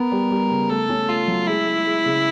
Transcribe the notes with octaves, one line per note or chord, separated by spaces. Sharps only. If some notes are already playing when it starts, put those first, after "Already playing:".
Already playing: B3 A#4
G3
G3
C#3
A3 A4
C#4
A3 F4
F#3
G#3 E4
G#3
G#3
C#3